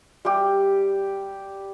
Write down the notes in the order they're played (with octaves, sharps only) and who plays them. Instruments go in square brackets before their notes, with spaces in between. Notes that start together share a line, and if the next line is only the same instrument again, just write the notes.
[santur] G3 G4